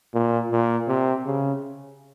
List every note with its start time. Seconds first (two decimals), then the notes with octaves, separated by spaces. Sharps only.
0.14 A#2
0.51 A#2
0.88 C3
1.26 C#3